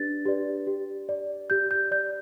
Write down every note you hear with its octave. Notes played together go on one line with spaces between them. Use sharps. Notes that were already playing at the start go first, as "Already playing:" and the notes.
Already playing: D4 G4 B4 D5 A6
G4 B4 D5
G4
D5
G4 G6
G6
D5 G6